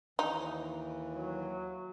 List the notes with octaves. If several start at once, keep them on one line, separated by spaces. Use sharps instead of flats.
D#2 E3 D#4
F#3